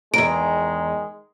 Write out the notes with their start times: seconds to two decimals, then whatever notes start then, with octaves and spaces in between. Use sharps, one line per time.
0.14 E2 G2 D#3 G#3 A#5 D7